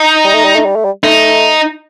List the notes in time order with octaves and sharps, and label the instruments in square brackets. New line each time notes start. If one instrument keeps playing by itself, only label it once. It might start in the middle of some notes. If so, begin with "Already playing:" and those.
Already playing: [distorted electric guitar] D#4
[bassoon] G3
A3
G3
A3
G3
A3
G3
[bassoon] A3 [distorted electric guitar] D#4